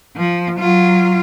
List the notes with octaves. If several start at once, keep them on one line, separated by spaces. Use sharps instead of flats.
F3
F#3 F4